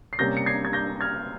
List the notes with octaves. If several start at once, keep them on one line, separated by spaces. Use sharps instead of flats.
C7
C3 G3 A#3 C#4 G6 A#6
C#7
G#6 C7
G#6
G6 A#6
F6 G#6